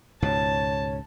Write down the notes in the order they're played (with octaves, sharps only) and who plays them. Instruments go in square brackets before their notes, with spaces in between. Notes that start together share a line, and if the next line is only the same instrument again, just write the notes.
[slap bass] C#2 G#2 B2 [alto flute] C#5 [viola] A5